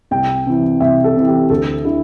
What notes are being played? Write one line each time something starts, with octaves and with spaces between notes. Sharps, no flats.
C2 G5
C3 E3
C2 E5
A4
C3 E3
G4
D2 A4
D3 E4